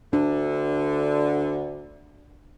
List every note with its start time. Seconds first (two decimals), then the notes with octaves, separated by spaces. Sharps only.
0.13 D2 D3 D4